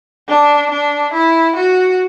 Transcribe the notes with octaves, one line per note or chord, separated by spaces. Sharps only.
D4
D4
E4
F#4